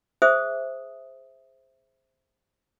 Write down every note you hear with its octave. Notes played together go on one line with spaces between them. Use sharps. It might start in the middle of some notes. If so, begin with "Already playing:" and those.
G#4 C5 E5 D#6